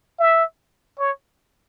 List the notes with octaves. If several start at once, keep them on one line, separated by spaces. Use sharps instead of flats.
E5
C#5